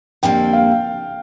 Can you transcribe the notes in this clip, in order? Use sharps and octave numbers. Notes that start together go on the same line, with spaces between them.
F2 D3 G3 A#3 G5
F5